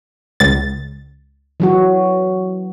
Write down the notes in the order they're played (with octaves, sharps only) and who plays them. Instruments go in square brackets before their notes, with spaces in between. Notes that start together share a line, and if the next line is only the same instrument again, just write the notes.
[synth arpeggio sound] C#2 A6
[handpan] E3 F#3 F#4